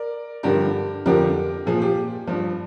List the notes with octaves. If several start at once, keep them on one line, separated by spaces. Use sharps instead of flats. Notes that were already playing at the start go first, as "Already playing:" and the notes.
Already playing: A#4 D5
G2 D3 F3 G4 A#4
F2 D3 F3 G4 A#4
A#2 F3 G#4
G4
G2 F3